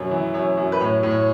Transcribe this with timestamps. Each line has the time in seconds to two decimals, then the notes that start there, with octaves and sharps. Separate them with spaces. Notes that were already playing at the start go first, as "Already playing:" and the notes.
Already playing: F#2 B2 C#5
0.11 E3
0.34 F#2 C#5
0.57 F#2
0.72 B4
0.80 A2 C#5
1.03 A2
1.11 C#5